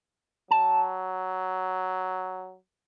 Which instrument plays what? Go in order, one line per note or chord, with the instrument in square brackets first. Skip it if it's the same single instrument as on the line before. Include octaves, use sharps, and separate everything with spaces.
[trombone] F#3 [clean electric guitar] A5